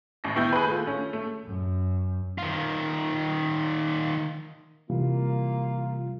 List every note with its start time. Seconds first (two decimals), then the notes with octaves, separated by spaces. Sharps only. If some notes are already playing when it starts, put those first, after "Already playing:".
0.24 A1 A#6
0.35 A2 B3 E4 G5 G6
0.52 G#4 B4
0.67 A3 F4
0.86 A3 C#4
1.13 A3
1.45 F#2
2.38 D#3 F4
4.90 C3 E3 G3 A#3 F4